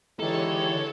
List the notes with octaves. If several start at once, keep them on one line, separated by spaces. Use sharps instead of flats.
D3 E3 G#3 D#4 G4 A4 C#5